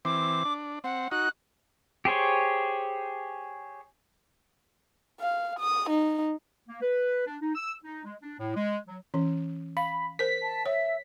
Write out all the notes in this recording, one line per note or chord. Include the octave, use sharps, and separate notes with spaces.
E3 C4 D6
D4
C4 F#5
D#4 F#4 F#6
G4 G#4 C5 C#5
F5
D#6
D#4
A#3
B4
D4
D#4
E6
D#4
G#3
D4
A2
G#3
F#3
E3 C#4
F5 B5
A#4 C5 B6
A5
C#5 E5